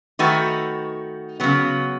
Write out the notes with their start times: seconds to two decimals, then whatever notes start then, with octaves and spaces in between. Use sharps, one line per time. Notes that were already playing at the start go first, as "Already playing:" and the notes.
0.19 D#3 A3 D#4 F#4 B4
1.40 C#3 F#3 B3